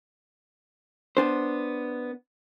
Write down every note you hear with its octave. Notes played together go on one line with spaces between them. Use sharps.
B3 D4 C5